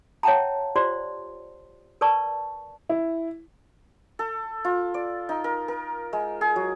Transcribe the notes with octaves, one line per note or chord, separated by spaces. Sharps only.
C#5 E5 F#5 G5 A5 A#5
F4 G4 C5 D5 C6
A#4 B4 D5 A5 C#6
E4
A4
F4
D5
D#4
A#4
A#4
G#3
G#4
F#3